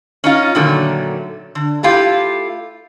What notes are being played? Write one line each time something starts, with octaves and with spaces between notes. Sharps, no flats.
C#4 D#4 F4
A#2 D3 D#3 F#3 A3
D3
A3 E4 F4 G4